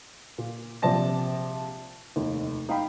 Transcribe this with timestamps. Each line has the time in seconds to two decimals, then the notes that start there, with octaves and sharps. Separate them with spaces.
0.38 A#2
0.82 A#1 C3 F3 D5 A5 A#6
2.16 F1 D#2
2.69 D#4 F5 G5 B5